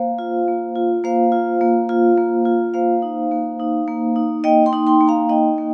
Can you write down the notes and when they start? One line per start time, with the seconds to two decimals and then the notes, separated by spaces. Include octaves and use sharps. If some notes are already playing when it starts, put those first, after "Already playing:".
Already playing: A#3 C5 F5
0.19 F4
0.48 A#3
0.76 F4
1.04 A#3 C5 F5
1.32 F4
1.61 A#3
1.89 F4
2.18 A#3
2.45 F4
2.74 A#3 C5 F5
3.02 D#4
3.31 A#3
3.60 D#4
3.88 A#3
4.16 D#4
4.44 A#3 D#5 G5
4.66 G5 C6
4.73 D#4
4.87 G5 C6
5.01 A#3
5.08 F5 A#5
5.29 D#4 D#5 G5
5.58 A#3